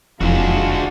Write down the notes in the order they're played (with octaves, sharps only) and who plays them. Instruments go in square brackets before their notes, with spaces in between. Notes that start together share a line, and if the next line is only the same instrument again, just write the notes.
[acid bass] E1 [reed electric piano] F2 E3 [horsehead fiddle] G#3 F4 [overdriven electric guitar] D4 F#4